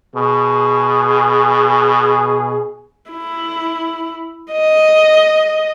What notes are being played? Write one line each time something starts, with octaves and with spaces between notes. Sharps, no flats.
B2 G#4
E4
D#5